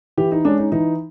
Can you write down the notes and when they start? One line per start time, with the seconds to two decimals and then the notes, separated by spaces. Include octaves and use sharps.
0.17 E3 G4
0.32 D#4
0.45 G#3 C#4 D4
0.58 D#4
0.72 E3 D#4